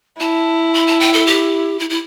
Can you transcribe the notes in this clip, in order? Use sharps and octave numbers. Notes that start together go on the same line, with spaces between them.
E4 A5
B5
A5
G5
A4
G4
E4
E4